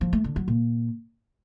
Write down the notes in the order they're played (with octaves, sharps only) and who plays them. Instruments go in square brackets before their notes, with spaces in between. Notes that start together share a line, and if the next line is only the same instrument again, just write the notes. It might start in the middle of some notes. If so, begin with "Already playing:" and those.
[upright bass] F3
A3
D3
F#3
A#2